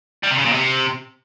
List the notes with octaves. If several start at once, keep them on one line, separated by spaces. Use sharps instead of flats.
G3
C3
C#3
A#2
C3